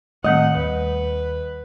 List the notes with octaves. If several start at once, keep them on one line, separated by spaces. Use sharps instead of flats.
A2 D#3 G3 A3 C4 D#5 F#5
D#2 B4